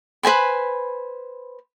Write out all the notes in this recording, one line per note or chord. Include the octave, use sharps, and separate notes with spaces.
B4 C5 G#5 B5